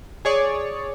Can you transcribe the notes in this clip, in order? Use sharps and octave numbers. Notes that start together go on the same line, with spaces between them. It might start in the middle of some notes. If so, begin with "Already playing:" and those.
G#4 C#5 D5